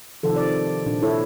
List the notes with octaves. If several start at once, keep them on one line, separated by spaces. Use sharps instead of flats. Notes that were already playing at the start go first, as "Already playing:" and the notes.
C3 D#3 F3 A4
D5
A#2 D4
E4 A4 C#5